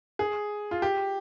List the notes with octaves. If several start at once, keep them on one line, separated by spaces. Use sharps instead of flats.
G#4
F4
G4